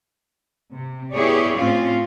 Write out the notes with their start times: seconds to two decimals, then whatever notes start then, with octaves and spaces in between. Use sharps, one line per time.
0.73 C3
1.13 B3 E4 G4 G#4 C#5 D5
1.57 A2 C4 C#4 F4